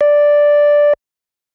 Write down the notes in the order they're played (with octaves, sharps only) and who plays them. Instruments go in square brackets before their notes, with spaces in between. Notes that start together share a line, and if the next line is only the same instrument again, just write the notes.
[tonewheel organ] D5